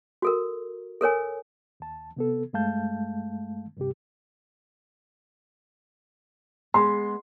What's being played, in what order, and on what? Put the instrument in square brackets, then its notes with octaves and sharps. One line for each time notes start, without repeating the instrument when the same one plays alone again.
[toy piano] F#4 A4 A#4
A4 A#4 C#5 G#5
[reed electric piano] D#2 A5
C3 B3 A4
G2 G#3 A3 F5 A5 G6
C#2 G2 C3 G4
[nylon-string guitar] G#3 B3 [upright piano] C6